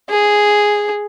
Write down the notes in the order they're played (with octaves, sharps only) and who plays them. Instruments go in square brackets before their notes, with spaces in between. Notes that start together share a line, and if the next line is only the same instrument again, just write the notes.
[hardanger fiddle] G#4